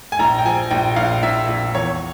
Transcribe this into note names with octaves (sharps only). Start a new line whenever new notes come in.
G#5
A#1 A#5
G5
F3 G#5
A#1 G5
A#1 F5
A#1 E5
A#1
E2 C#5